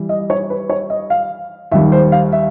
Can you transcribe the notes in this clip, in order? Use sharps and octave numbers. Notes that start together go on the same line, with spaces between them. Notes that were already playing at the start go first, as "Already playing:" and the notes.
Already playing: E3 G3
D#5
C#5
B4
C#5
D#5
F5
D#2 D#3 G3 E5
C5
F5
E5